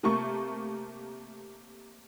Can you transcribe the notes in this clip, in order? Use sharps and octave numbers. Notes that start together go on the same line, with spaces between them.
C3 A3 A#3 C#6